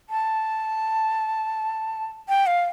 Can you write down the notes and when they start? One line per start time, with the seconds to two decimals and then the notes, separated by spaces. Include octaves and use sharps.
0.10 A5
2.29 G5
2.47 F5